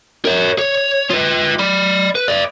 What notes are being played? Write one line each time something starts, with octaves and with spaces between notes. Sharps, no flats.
A#4 C#5
C#5
F4 B4
D5 B5
B4
B4 D5